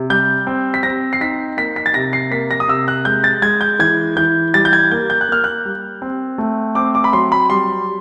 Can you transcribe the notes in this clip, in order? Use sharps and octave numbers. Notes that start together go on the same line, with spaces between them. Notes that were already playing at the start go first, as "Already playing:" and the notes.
Already playing: C3
G3 G6
C4
B6
C4 A#6
C7
D#4 B6
A#3 B6
B6
A6
C3 A#6
C7
A#3 B6
A#6
D#6
C3 E6
F#6
G#3 G6
A6
G#3 G#6
G6
E3 G#6
E3 G6
G3 A6
G6
G#6
A#3 G6
G6
F#6
A#3 F6
F#6
G3
C4
A3
C4 D6
D6
B5
F#3 C6
B5
G3 C6